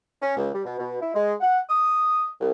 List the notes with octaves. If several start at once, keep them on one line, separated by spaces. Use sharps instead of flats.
C#4
C#2
G3
B2
B2
E4
G#3
F#5
D#6
C2